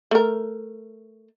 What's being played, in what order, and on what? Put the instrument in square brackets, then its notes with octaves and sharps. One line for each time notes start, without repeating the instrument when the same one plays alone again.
[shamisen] A3 A#4